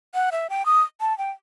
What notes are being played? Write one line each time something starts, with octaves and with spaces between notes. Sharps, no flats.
F#5
E5
G5
D#6
A5
G5